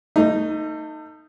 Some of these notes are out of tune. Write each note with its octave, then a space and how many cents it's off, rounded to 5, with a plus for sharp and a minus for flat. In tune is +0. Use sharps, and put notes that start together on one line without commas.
A3 +35 D#4 +0